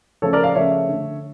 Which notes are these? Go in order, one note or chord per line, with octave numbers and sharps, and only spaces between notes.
C#3 F3 A3 A4 C#5
A#4 D5
D5 F5
C#3 F3 A3 C#5 E5
D3 A3